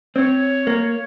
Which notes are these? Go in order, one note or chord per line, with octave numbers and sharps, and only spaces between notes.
C4 C#5
A#3